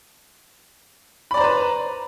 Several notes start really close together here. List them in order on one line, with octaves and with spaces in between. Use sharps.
B5 D5 A#5 C5 B4